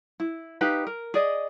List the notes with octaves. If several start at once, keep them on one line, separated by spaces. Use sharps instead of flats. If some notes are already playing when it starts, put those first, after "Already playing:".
E4
D#4 G4 B4 F5
A#4
G#4 D5 D#5